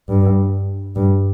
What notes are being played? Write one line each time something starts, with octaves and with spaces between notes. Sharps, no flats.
G2
G2